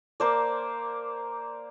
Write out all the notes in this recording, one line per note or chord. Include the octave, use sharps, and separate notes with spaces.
A#3 C5 D5